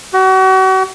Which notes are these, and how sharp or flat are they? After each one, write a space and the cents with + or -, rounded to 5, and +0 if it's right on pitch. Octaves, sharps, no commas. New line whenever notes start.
F#4 +35